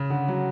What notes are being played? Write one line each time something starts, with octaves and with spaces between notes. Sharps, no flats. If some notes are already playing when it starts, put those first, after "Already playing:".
Already playing: C#3
D3
F#3